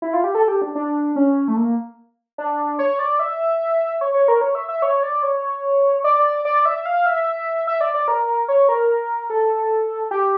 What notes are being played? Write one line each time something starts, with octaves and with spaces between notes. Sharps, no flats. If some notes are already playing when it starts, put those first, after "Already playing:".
E4
F4
G4
A4
G4
D4
D4
C#4
A3
A#3
D4
C#5
D5
E5
C#5
C#5
A#4
C#5
E5
E5
C#5
D5
C#5
D5
D5
E5
F5
E5
E5
D5
D5
A#4
C#5
A#4
A4
G4